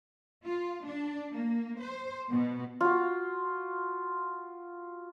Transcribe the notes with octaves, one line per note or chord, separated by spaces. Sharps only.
F4
D4
A#3
C5
B2
F4 F#4